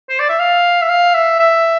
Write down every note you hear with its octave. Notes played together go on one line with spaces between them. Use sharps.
C5
D5
E5
F5
E5
F5
E5
E5